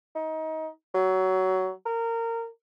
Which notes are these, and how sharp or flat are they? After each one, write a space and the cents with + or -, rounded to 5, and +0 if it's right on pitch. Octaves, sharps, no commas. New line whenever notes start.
D#4 +25
F#3 +20
A#4 -20